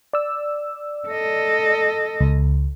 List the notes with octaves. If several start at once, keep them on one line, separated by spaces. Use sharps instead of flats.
D5 E6
A4 D#5
C#2